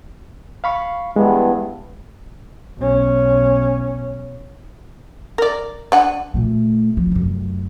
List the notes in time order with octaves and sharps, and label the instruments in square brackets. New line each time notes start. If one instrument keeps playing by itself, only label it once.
[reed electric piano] F5 B5 C#6
[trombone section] G2 E3 B3 [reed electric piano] G#3
[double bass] B1 C#4
[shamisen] A#4 D5
D4 F#5 G#5
[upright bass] A#2 A3
F3
F1 F#2